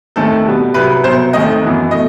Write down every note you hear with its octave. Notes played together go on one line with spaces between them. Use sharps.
D#2 D#3 A3 C4 A4
B2 G3 B3
C2 C3 F#3 B4
C2 B2 F#3 C5
D#2 D#3 A3 C4 D#5
F#2 E3 B3
B2 A3 D#5